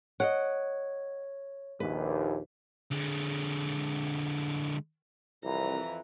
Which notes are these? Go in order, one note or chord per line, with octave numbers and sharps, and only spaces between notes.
C#5 D#5 F5 F#5
A#1 D#2 B4
D3 G#3
C2 F2 E3 A#5